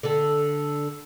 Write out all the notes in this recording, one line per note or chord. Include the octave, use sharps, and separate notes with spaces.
D3 A4